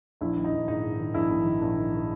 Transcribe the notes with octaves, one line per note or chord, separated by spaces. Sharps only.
A#1 E4
D#3
D#4
A#1
G#2 D#4
G#2
D#3
A#1 E4
A#1
D#3
A#1
D#3
D#3